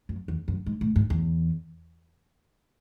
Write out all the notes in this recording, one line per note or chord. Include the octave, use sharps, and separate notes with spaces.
F#2
E2
F#2
G#2
A2
G#2
E2